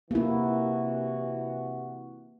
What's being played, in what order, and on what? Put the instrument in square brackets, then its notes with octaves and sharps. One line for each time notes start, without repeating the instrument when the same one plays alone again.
[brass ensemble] C3 E3 F#4 [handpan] A#3 E4